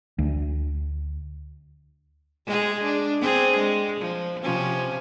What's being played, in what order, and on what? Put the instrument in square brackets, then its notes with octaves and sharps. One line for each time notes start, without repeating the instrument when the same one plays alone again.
[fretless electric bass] D2
[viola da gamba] G#3 G#4
D4
C4 D4 G#4
G#3
F3
C3 F3 C#4